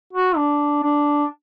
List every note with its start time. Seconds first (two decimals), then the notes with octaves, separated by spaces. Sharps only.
0.13 F#4
0.37 D4
0.83 D4